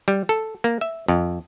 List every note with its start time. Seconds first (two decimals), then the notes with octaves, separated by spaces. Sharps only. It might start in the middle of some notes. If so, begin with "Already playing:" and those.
0.08 G3
0.29 A4
0.64 A#3
0.81 E5
1.08 F2